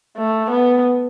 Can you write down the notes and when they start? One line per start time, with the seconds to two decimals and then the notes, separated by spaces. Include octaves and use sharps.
0.16 A3
0.51 B3